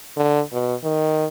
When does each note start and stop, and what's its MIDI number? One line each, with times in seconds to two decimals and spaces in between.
0.16 0.41 50
0.53 0.75 47
0.83 1.27 51